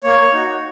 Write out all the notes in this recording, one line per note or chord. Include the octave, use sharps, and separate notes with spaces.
A#3 C#5
D#4 F#4